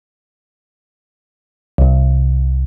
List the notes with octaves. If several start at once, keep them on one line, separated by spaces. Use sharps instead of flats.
C2